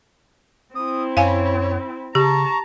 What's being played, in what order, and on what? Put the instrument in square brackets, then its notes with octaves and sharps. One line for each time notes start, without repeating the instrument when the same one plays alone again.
[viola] C4 E4 [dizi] D#6
[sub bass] F#2 [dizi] C#5 [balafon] F5 G#5
[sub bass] C#3 [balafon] G4 [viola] A5 A#5 [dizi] C#6